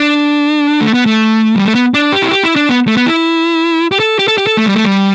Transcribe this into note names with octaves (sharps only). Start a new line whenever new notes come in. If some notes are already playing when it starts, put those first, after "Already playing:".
Already playing: D4
A3
B3
A3
G3
A3
B3
D4
G4
E4
G4
E4
D4
B3
A3
B3
E4
G4
A4
G4
A4
G4
A4
A3
G3
A3
G3